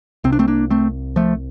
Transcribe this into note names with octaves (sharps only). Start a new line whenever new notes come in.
C2 C3 C4
D4
A3 C4
A#3 D4
A3 C4
F3 A3